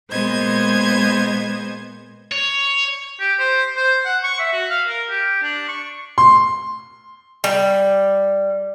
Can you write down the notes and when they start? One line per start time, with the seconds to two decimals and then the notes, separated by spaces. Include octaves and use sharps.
0.11 A#2 G#3 B3 C5 D#5 G#6
2.32 C#5
3.20 G4
3.39 C5
3.76 C5
4.05 F#5
4.23 C#6
4.39 E5
4.53 F#4
4.70 F5
4.88 A#4
5.10 G4
5.43 D4
5.68 C#6
6.18 C6
7.44 G3